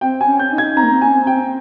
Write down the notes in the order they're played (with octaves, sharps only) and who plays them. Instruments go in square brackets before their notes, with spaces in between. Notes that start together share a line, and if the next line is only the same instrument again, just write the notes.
[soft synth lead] C4 [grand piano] G5
[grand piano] G#5
[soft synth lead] C#4
[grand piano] G6
[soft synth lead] D#4
[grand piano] G#6
[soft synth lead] C4 [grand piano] A#5
[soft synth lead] A#3
C4
[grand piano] G#5
[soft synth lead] C#4
C4
[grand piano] G5